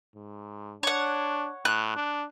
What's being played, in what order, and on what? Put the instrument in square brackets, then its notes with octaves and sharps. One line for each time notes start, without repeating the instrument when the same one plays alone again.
[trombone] G#2
[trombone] D4 [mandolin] C#5 F#5
[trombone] A2 [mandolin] F#6
[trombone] D4